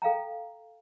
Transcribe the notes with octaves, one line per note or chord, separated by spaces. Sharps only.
A4 F5 G5 A#5